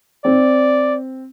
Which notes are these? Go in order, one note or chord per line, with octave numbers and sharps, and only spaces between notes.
C4 D5